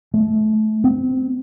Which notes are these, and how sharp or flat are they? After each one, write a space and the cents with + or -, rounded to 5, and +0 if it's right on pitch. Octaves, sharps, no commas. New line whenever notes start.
A3 -30
C4 -20